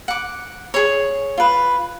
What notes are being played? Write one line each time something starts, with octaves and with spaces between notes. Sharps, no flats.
F#5 D6
G#4 C#5
F4 B4